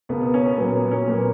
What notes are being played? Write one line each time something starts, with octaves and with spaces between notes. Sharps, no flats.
C#2 B2 A#3 B3
B3
C#4
B3
A#2 F#3 A#3 B3
B3
C#4
A#2 F#3 A#3 B3